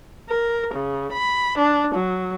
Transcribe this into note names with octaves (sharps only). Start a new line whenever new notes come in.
A#4
C#3
B5
D4
F#3